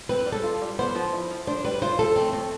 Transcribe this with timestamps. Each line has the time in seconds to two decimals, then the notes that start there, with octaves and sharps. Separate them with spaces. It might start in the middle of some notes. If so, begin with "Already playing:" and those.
0.09 C4 B4
0.26 G3
0.32 A4
0.43 F4
0.62 G3
0.79 B3 C5
0.95 F3
1.13 E4
1.31 F3
1.47 D4 C5
1.65 G3 B4
1.82 F4 C5
1.99 G3 A4
2.16 A3 C4
2.33 F3 C4